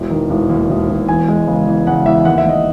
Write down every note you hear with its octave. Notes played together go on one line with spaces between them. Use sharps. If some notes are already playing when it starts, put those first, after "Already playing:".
Already playing: E1
D#3
E1
D#2
E1
E1
E2 G#5
G#3
C#3
E2
C#3 F#5
E2 E5
D#2 F#5
E5
D#2 D#5